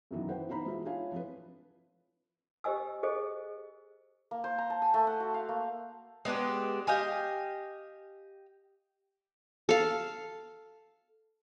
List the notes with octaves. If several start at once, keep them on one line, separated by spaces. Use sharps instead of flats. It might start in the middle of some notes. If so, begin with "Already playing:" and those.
F#2 B2 D#3 E3 F#3
B4 C5 F#5 G5
B2 E3 D#4 C5 A#5 B5
G#3 F4 F#4 E5
D4 E4 F4 C#5 F5 G#5
F3 C4 F4 B4
G4 C5 D#5 G#5 E6
G#4 A4 C5 D#5
A#3
C5
A#5
A5
G#5
A3
F#5
F#4
F5
A#3
G#3 B3 D4 G4
G4 D#5 F5 G#5
A4 F5